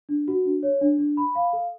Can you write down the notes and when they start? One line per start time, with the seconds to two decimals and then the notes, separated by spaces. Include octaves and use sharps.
0.09 D4
0.28 F#4
0.45 D4
0.63 C#5
0.81 D4
0.98 D4
1.17 B5
1.35 F5
1.53 A4